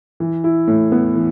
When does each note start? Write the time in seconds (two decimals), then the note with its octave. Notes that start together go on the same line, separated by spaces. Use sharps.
0.20 E3
0.44 E4
0.68 A2
0.92 B3
1.16 E3